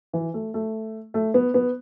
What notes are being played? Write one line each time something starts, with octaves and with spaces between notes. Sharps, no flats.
E3
A3
A3
A3
B3
B3